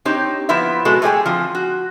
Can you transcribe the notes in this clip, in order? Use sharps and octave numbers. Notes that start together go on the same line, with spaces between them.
C4 D#4 G4 C#5
F3 B3 C4 E4 E5
B2 G#3 F#4 A4
A3 G4 G#4 D5 G5 G#5
F3 C4
F#4